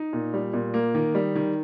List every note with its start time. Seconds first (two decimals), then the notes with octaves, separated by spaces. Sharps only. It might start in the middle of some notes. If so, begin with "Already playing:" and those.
Already playing: D#4
0.13 A#2
0.34 G3
0.53 A#2
0.74 A#3
0.95 D#3
1.15 G3
1.35 D#3